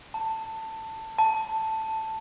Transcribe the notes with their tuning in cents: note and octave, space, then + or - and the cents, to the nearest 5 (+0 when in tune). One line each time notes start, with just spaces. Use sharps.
A5 +15
A5 +5